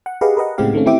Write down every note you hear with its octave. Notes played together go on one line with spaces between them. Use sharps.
F#5
G4 G#4 B4 D#5 F5 F#5
A#4 B4 D#5 F#5
A2 C#3 G#3 C4 G4 F5
D#3 A3 C4 C#4
E3 C4 E4 G4 E5 D6